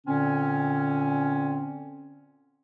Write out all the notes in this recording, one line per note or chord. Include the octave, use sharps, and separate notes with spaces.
A#2 D3 C4 C#4